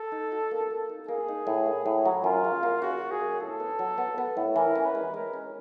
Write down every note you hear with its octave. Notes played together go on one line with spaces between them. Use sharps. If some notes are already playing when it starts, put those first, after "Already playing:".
Already playing: A4
D#4
F#4
A#3
A#3
D#4
A#3 G#4
D#4
A2
A#3
A2
F#3
F#2 F4
C#3
A#3
C#3 F#4
A#3
G#4
F#2
A2 A4
B3
F#3
B3
B3
A2
E3 A#4
C#4
B4
G#3
G#3 A#4
C#4